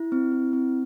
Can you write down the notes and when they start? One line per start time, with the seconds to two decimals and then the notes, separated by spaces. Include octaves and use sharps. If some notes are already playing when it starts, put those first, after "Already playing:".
Already playing: E4
0.12 C4
0.32 E4
0.53 C4